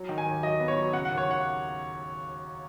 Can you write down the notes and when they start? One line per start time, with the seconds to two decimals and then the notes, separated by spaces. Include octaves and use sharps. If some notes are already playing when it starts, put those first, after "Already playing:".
Already playing: F#3
0.09 D#3
0.18 G#5
0.26 D#2
0.43 F#3 D#5
0.60 B3
0.68 C#5
0.76 F#3
0.93 C#3 F#5
1.05 F#5
1.10 D#2
1.18 C#5
1.27 D#2 F#5